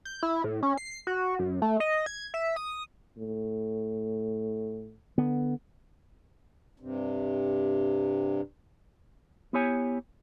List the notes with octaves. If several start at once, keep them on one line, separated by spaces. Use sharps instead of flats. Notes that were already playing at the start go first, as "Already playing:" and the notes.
G6
E4
A2
C#4
C7
F#4
F#2
A3
D#5
G#6
E5
D#6
A2
D3 B3
G2 C3
B3 E4 G4 C#5 G#5